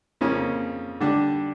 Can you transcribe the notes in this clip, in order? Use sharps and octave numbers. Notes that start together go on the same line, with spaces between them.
F2 C#3 F3 A#3 C#4
D3 G3 D4